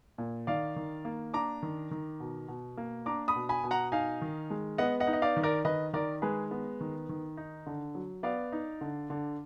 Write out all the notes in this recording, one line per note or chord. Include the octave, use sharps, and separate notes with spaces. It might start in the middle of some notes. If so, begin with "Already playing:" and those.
A#2
D#3 D5 F5
D#3
A#3
D4 A#5 D6
D#3
D#3
B2
B2
A#3
D4 A#5 D6
B5 D#6
B2
G#5 B5
B2
F#5 A#5
D#4 F5 G#5
D#3
G#3
B3 D#5 F#5
D#5 F#5
D#4
D#5
D5 F5
D#3
A#4 D5
D#3 B4 D#5
D#3 A#4 D5
G#3 G#4 B4
B3
D#3
D#3
D#4
D3
F#3
B3 D5 F5
D#4
D3
D3